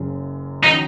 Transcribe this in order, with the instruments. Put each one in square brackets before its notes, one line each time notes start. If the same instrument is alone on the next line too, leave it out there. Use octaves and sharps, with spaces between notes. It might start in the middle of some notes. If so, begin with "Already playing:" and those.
Already playing: [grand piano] F#1 F#2 C#3
[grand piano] D#3 F#3 C#4 F#4 [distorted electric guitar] D#4